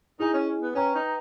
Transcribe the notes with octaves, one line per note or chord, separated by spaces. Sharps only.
D#4 E4 G#4 D#5 G#5
C#4
B3
C#4 B4 G5 A#5
D#4